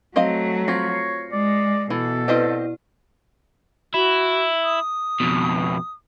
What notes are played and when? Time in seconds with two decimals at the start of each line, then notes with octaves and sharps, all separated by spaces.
0.16 F#3 A3 C4 D#5 F5
0.68 C4 F4 C#5 A#6 C7 C#7
1.32 G#3 D5
1.90 B2 E3 A4
2.28 C4 E4 G4 B4 D5 D#5
3.94 E4 F#4
4.64 D#6
5.20 F2 B2